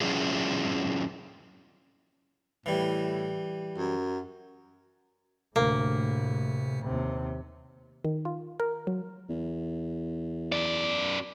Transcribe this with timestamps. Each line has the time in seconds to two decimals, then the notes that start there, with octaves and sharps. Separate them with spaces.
0.01 F#3 C#4 D4 E4 F4 G#4
2.66 A2 E3 G3
3.78 F#2
5.56 D2 A2 C3 A#3
6.83 D#2 C3
8.05 D#3
8.25 F4
8.60 A#4
8.87 F#3
9.29 E2
10.52 F#2 D5